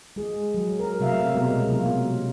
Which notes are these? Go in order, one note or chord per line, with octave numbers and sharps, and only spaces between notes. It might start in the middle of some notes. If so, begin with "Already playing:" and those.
G#3 G#4
F#3
A#4
C3 F#3 A3 A#4 E5 F5
B2 G#3 A#4
C3 F#3 A#3 F4